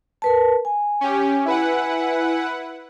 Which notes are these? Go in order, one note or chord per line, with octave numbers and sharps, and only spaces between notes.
A#4 B4 A5
G#5
C#4 G4
E4 B4 F#5